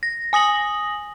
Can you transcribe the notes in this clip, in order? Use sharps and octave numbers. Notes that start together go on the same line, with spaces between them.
A#6
G#5 D#6 A#6 F#7